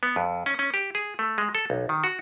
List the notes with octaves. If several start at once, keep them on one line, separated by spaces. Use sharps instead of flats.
B3
F2
C#4
C#4
G4
G#4
A3
G#3
A4
B1
D#3
F#4